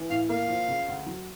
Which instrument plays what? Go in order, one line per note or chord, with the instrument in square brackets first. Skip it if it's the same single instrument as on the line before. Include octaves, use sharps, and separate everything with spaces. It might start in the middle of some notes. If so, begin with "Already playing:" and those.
Already playing: [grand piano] E3
[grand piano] A2 [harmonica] F5
[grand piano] A#3 [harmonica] F5
[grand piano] F3
C#3
D2
F#3